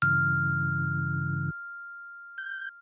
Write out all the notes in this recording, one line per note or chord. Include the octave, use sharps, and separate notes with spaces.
G2 C#3 E3 F6
G6